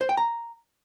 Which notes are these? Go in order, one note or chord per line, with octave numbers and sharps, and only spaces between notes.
C5
G5
A#5